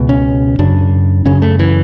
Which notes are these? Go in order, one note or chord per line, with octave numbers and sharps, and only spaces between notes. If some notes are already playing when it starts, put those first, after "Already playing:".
Already playing: C#2 B2
C#4
F#2 C#3 D4
F#2 C#3 C#4
A3
E3